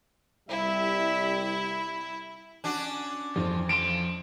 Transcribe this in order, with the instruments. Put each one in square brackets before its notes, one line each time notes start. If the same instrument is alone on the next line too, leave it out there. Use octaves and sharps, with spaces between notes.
[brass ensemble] C2 G3 E5 [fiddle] E4
[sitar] C#4 D4 F#4
[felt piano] F2 E3 C5 [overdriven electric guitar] F3
[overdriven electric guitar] F3 C6 [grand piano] D7 E7